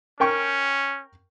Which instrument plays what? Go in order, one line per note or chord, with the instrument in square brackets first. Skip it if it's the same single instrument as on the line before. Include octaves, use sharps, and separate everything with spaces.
[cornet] C#4 [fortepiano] A#4 G5 C#6